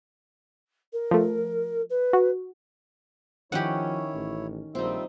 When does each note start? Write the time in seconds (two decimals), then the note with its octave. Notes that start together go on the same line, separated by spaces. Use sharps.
0.93 A#4
1.11 F3 A3
1.90 B4
2.13 F#4
3.52 D#3 F3 C#4 E4 G4 C#5 F#5
4.15 A1
4.75 A#1 G3 C4 D#4 F4 E5